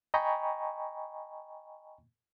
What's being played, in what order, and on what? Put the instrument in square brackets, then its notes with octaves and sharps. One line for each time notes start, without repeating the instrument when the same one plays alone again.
[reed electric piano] D#5 G5 G#5 A#5 B5 C#6